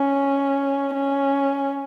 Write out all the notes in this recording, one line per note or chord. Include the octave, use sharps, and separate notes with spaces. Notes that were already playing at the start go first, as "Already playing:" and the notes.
Already playing: C#4
C#4